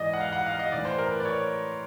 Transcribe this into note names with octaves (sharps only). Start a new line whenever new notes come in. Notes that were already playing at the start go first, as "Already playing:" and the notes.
Already playing: G#2 E3 D5 D#5
F#5
F5
F#5
F5
D#5
A2 E3 D5
C5
A#4
B4
D5
C#5